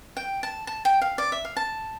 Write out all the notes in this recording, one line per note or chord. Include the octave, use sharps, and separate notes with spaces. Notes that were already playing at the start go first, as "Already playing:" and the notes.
G5
A5
A5
G5
F5
D5
E5
F5
A5